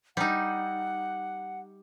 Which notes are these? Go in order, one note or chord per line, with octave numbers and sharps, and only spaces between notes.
G3 D#4 F#5